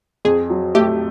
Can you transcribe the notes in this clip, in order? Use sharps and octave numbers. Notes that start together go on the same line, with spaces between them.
F2 G#4
F#3
A3 G4